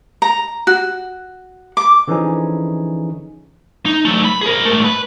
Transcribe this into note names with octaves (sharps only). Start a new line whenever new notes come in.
A#5
F#4
D6
D3 E3 F3 C#4 D#4 G#4
D#4
F#3 A3
B5
G#4 A#4
G#2 A3
B4